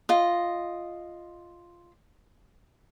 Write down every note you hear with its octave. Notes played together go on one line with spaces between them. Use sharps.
F4 D#5